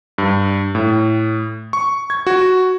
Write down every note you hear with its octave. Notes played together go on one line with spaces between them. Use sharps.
G2
A2
C#6
G#6
F#4